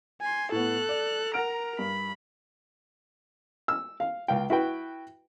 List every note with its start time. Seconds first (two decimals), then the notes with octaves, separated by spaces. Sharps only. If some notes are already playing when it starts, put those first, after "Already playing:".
0.22 G#5 C6
0.52 A2 B3 A4 F#6
0.89 D5
1.34 A#4 F#5 A#5 F6 D7
1.79 G2 B5
3.68 E6
4.00 F5
4.28 C#2 F5 G5
4.50 E4 F#4 B4 G5